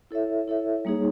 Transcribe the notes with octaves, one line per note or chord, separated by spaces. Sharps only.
E4 A4 C#5 E5
E4 A4 C#5 E5
G3 A#3 D#4 G#4 C#5